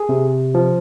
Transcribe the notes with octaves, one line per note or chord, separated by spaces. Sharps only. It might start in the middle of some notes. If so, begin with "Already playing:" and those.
Already playing: G#4
C3
F3